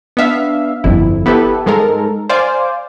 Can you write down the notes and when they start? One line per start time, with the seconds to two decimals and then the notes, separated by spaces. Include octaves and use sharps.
0.17 B3 D4 E5 F5
0.84 G1 F2 E4
1.26 B3 E4 G4 A4 B4
1.66 G#2 G#3 A4 A#4
2.29 C5 D5 F5 G#5